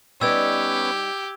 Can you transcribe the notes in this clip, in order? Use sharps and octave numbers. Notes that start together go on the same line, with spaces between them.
G3 B3 C#4 D#4 G4 B4 E6 G#6